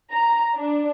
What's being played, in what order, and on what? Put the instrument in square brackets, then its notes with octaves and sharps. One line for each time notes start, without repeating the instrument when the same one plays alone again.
[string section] A#5
D4